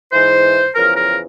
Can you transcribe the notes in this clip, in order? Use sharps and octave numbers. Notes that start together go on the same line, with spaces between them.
G#2 E3 C5
E2 C#3 F3 A#4
A#4